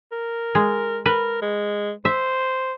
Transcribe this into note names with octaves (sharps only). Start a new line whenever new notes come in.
A#4
G#3
A#4 B4
G#3
C5 E5